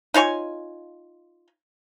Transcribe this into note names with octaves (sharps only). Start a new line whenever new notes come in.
D#4 F4 C#5 G#5